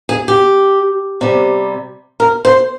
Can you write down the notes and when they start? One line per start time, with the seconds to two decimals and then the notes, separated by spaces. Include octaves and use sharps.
0.09 G#4
0.28 G4
1.21 C3 G3
2.20 A#4
2.45 C5